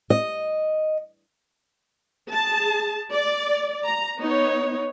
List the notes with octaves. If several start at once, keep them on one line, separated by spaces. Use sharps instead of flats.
D#5
G#4 A5
D5
A#5
B3 D#4 C#5